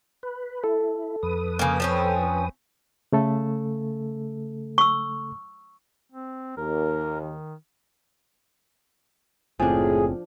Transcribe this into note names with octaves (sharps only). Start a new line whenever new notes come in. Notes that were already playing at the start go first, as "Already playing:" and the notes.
B4
E4 A4
F2 B4 D#6
C#3 A#3
F3 C4 C#4
C#3 A3 A4
C#6 E6
C4
D#2 A#4
D#3
F#1 A2 F3 C4 D4 G#4